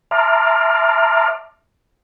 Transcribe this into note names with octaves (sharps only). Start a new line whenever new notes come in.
E5 A5 A#5 C6 D6 F6